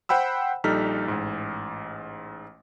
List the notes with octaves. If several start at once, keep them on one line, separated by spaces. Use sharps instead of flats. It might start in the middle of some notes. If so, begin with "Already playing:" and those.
C5 F#5 G5 B5 E6
A#1 G3 D#4 A4 F6 B6
A1 G#2